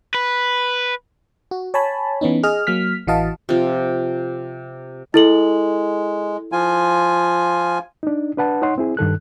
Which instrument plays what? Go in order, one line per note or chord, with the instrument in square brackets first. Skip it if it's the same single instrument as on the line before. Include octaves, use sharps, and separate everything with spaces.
[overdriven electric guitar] B4
[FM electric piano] F#4
C#5 G#5 A5 B5
E3 B3 C#4 D#4
G#4 D#5 F6
F#3 A#3 F6 B6
A1 E3 F#4 D#5 F5 A5
[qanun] C3 F3
[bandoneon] G#3 [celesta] E4 A4 F#7
[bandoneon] F3 F4 G#5
[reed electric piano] D4 D#4
D4 B4 F#5 A5
D#4 C#5 F#5 C6
C4 E4 G#4
G2 D#3 A4 F#6